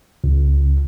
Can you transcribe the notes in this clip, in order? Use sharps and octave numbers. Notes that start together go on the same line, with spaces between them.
C#2